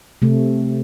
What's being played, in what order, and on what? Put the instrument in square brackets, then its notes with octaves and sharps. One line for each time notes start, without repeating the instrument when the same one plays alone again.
[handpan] C3 A3